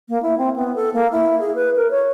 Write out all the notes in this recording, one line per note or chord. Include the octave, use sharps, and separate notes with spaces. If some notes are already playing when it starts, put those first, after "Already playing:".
A#3
E4
C4
B3
A4
A#3
E4
G#4
B4
A#4
C#5